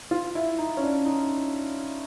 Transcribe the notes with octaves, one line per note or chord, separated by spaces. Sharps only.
F4
E4
D#4
C#4
D4
D#4